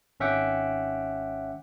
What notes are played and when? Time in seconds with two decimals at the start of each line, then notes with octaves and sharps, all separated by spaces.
0.20 G#1 C#4 E5 F#5 G5 D6